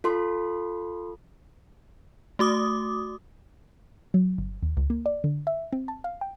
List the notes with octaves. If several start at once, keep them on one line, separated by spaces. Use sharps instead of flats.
F4 A4 C6
A3 F#4 D6 D#6
F#3
G1
D#2
C#2
A#3
D5
D3
E5
C4
A5
F5
G5